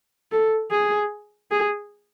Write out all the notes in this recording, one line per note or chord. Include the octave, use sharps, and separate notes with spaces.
A4
G#4
G#4